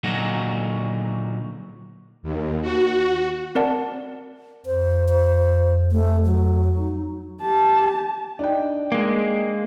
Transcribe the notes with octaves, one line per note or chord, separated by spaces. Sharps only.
A#2 D3 F#3 D#4 F#4
D#2
F#4
C4 A#4 D5 F#5 A5
F2 C5
C5
A3
F#3
D#4
G4 A5
D4 D#4 G5
G#3 A#3